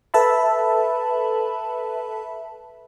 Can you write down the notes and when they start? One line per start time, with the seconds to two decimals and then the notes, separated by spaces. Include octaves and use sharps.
0.14 A4 B4 E5 A5 B5